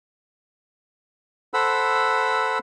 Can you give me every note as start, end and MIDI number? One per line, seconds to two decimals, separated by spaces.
1.54 2.59 69
1.54 2.59 72
1.54 2.59 78
1.54 2.59 83
1.54 2.59 88